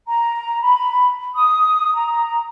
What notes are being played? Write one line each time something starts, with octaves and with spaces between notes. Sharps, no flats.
A#5
B5
D#6
A#5